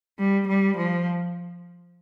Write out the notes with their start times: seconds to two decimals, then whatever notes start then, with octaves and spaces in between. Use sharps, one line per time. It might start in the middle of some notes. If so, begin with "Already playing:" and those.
0.19 G3
0.47 G3
0.77 F3